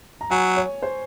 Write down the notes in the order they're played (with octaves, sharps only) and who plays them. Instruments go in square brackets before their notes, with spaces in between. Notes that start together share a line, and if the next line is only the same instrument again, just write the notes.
[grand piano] A#5
[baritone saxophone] F#3 [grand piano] G#5
[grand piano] C#5
C5